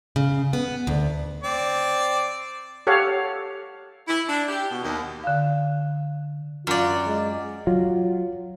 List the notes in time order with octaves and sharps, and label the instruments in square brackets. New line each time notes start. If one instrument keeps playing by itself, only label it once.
[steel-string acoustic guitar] C#3
B3
D2
[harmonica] C4 D5
[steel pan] G4 A4 C#5 F5 F#5
[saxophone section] E4
D4
G4
B2
D#2
[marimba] D3 F5
[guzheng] F#2 D5 [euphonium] F4
[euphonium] G#3
[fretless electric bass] F#3 [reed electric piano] F4